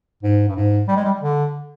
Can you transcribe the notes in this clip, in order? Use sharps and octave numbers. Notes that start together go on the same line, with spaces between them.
G#2
G2
G#2
G3
G#3
G3
D3